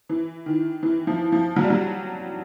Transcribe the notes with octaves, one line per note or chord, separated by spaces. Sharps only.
E3
D#3
E3
F3
F3
F#3
G3
F#3